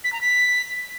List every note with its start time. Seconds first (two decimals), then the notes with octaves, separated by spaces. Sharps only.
0.04 B6
0.13 A#5
0.21 B6